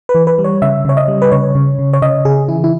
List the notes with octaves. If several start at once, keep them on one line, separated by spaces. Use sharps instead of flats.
B4
E3
B4
G3
C#5
C#3 E5
C#3 C#5
D#5
G3
B4
C#3 C#5
C#3
C#3
C#5
C#3 D#5
C#3 G#4
E3 E4
E4